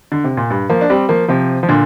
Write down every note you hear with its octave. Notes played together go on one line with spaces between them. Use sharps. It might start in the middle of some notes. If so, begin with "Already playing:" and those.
D3
C3
A#2
G2
F3 A#3
D4
G3 C4
F3 A#3
C3 F3
F3
A#2 D3